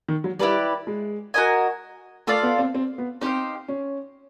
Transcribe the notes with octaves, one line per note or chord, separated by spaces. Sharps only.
D#3
F#3
G3 E4 G4 B4 D5
G#3
F#4 A#4 D#5 G#5
A3 F4 A4 D5 F5
B3
C4
C4
B3
C4 D#4 G4 C5 F5
C#4